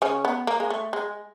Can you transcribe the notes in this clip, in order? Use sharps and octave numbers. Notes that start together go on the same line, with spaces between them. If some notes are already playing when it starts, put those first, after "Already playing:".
C#3 C#4
B3
A#3
G#3
A3
G#3